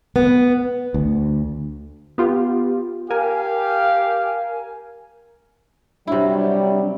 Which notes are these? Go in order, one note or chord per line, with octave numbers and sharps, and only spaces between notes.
B3
D2
B3 F4 G4
G4 A#4 F5 G#5
C3 F#3 G3 D4 E4